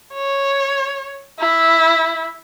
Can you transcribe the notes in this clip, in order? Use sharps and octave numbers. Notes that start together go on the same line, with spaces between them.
C#5
E4